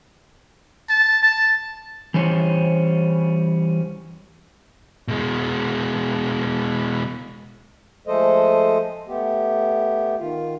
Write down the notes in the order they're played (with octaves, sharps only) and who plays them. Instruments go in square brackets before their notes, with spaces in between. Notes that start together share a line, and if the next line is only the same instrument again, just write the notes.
[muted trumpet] A5
A5
[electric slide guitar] E3 G3 C#4 C5
[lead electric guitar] B2 G#3
[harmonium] F3 G#3 A3 A4 C5 D#5
A3 B3 G4
D#3 F4